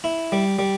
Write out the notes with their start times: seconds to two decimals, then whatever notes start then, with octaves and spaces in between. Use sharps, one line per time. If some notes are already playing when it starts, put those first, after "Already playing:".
0.04 E4
0.32 G3
0.59 G3